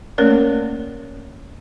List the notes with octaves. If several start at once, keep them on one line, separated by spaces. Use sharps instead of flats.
A3 A#3 C#4 A#4 C#5 D5